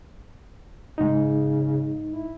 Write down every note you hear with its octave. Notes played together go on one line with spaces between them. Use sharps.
G#2 C#3 D#4
E4